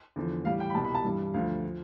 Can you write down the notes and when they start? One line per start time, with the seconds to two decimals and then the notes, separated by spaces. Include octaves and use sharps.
0.16 E2 D3 F3
0.45 A2 E3 G3 F5
0.60 G5
0.70 B5
0.74 C2 B2 G3 A5
0.84 B5
0.95 A5
1.05 G2 E3 G3
1.34 D2 D3 F3 F5
1.64 F3